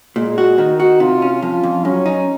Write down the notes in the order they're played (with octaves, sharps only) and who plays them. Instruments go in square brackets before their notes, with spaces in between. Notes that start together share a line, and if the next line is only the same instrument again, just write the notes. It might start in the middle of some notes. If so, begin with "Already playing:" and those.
[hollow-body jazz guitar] A#2 [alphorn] G#3
[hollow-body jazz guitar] F#4
[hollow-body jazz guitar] D#3 [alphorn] D#4
[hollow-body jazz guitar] F#4
[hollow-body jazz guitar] C3 [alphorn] F4
[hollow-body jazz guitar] C#4
[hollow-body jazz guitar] F2 [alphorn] F4
[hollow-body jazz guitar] F2
[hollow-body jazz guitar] F#2 [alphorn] C#4
[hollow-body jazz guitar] D#4